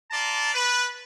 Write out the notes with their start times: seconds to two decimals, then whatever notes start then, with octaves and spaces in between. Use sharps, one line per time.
0.11 F4 D5 A5 A#5
0.53 B4